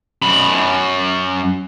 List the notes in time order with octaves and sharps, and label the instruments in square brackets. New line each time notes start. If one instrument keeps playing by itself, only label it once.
[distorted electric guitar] F#2 B5